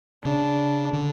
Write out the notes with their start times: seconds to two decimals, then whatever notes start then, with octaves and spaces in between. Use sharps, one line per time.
0.24 C#3 D4
0.93 D3